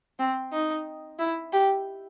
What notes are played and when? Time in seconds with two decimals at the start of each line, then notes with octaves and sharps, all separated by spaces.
0.19 C4
0.52 D#4
1.19 E4
1.53 G4